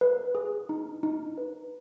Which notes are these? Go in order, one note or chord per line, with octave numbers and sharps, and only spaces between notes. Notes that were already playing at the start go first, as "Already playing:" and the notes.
B4
G#4
D#4
D#4
B4